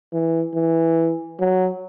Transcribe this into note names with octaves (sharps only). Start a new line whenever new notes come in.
E3
E3
F#3